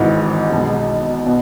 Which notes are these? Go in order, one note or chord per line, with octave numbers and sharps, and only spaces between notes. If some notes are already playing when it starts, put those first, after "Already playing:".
Already playing: G#1 G#2 E3
B1 B2 G#3
B2